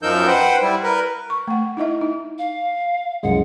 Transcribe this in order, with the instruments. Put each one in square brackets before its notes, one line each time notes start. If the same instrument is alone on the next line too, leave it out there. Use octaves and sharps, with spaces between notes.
[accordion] F#2 F3 D#4 A#4 E6 G6
B4 C5 F#5 G5
G3 E4
A#4 B4
[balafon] C#6
A3 F#5
D#4 E4 D#5 E5
D#4
[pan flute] F5
[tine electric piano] C2 F#2 G#3 [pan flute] F#5